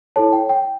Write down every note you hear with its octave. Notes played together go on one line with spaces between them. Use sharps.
E4 A4 C#5 A5
G5
G5